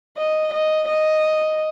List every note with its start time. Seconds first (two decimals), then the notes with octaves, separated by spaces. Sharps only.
0.18 D#5
0.54 D#5
0.88 D#5